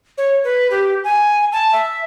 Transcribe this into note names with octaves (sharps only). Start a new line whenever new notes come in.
C#5
B4
G4
G#5
A5
E5